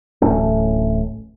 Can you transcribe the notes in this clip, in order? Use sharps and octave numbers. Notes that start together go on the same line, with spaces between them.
D1 A1 A3 C#4